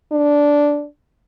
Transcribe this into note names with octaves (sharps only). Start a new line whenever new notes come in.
D4